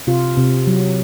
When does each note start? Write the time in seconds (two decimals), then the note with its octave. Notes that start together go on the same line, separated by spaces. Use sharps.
0.07 C3 F4
0.37 C3
0.67 F#3